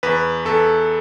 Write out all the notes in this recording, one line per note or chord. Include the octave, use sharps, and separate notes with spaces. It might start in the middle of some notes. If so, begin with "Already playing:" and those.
E2 B4
E2 A4